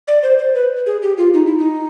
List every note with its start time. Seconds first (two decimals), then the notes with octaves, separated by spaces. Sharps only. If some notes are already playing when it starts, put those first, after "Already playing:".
0.08 D5
0.23 C5
0.39 C5
0.55 B4
0.86 G#4
1.02 G4
1.18 F4
1.34 D#4
1.46 E4
1.58 D#4